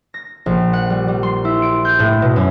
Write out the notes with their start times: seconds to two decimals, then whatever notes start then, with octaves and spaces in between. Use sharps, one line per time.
0.14 A#6
0.46 A#1
0.73 F#5
0.90 G3
1.08 G3
1.23 C6
1.45 E4
1.62 D7
1.85 G6
1.99 A2
2.22 B2
2.36 F#2